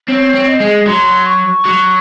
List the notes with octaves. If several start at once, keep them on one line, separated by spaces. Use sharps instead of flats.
C4 C#5
C4
D#5
G#3
F#3 C6
C#6
F#3